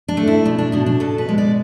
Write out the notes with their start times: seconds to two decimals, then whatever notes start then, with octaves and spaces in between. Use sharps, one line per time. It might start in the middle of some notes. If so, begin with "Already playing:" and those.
0.08 D4
0.17 A3
0.27 E4
0.45 B2 D4
0.58 D4
0.72 B2 D4
0.86 D4
1.00 B2 A4
1.18 B4
1.29 G#3
1.38 D5